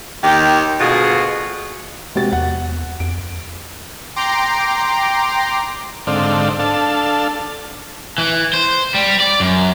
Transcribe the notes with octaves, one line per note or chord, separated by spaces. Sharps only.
D#2 D#3 G4
D2 B2 F4 G#4
C3 G#3 F#4 A6
E2 F#5
F2 D7
G5 A#5 C6 D6
G#2 D3 C4 A4 D5 F5
D4 A4 F5 A5
E3
C5
G3
D5
F#2